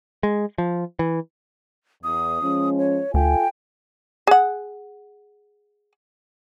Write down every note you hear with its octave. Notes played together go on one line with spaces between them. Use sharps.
G#3
F3
E3
E2 D#6
F3 G#3 C#4
C#5
D2 F4 A4 G5 G#5
G#4 F#5